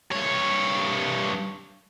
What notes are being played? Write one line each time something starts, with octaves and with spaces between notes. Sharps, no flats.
G2 C#5